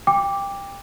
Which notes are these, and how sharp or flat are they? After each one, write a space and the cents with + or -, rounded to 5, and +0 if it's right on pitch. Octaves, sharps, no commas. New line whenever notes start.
G5 +20 D6 -5